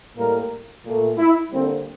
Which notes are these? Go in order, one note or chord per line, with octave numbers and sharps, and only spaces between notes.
A2 G3 A#3 A#4
A#2 A3
E4
D3 G3 A#3 C4